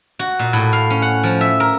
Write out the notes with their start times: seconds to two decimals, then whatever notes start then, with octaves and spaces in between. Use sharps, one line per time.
0.19 F#4
0.39 A#2
0.53 A2
0.73 F5
0.90 C#4
1.02 F#5
1.23 F3
1.41 E5
1.60 A#4